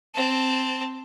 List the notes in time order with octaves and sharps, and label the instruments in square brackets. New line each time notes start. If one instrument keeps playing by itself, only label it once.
[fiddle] C4 A5